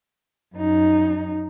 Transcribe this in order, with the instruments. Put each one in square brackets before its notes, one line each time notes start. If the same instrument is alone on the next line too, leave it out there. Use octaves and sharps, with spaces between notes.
[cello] F#2 D#4